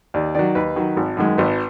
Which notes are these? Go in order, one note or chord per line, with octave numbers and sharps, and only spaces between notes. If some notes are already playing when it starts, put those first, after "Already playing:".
D#2 D5
D#3 F#3 D5
D#2 B4
D#3 F#3
G#1
F#2 D#3 G#3
G#1 B4